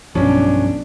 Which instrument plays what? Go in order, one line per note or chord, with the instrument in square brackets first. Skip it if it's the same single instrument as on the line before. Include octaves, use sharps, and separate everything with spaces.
[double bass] B1 D4 [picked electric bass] G2 F3 [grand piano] C#4